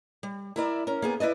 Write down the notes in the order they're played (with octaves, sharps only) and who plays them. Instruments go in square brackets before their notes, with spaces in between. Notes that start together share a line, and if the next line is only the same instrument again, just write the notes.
[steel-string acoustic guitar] G3
E4 A#4 D5 E5
C#4 A#4
A#3 B3 G#4
E4 B4 D5 D#5